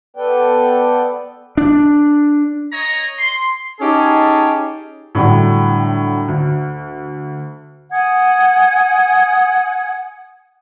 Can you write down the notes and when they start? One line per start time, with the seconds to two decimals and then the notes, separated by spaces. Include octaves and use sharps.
0.17 B3 A4 B4 D5 G5
1.57 D4
2.72 C#5 D#5 A#5
3.19 C6
3.80 C#4 D#4 G4 G#4 A5
5.15 A2 D3 F#3 G3 F#5 G5
6.28 D2
7.91 F#5 G#5 D#6 G#6